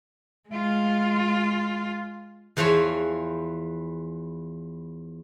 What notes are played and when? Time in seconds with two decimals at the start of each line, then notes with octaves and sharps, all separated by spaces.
0.50 G#3 F4
2.57 E2 E3 F3 C#5 G#5